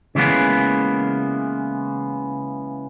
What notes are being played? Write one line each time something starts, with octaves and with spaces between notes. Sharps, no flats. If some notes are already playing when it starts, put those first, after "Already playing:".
C#3 E3 G#3 A#3 B3